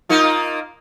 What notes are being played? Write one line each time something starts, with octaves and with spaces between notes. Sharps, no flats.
A#3 D#4 F4